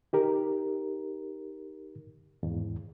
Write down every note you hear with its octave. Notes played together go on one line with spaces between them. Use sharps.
D#4 G4 A#4
E2 G#2